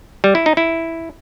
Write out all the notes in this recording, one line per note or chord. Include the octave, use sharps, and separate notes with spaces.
G3
E4
D#4
E4